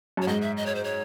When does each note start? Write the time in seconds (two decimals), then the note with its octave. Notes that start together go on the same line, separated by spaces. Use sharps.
0.17 F#2 C#5
0.27 G#2 D#5
0.42 E5
0.57 D#5
0.66 C#5
0.75 C5
0.84 C#5